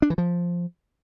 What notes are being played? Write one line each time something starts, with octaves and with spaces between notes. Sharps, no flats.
D4
E3
F3